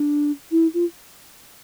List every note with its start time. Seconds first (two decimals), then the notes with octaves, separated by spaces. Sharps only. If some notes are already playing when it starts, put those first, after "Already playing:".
Already playing: D4
0.51 E4
0.74 F4